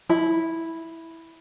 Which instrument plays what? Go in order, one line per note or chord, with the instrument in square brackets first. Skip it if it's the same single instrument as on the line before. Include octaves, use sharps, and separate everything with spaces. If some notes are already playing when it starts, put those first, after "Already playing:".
[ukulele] E4 B5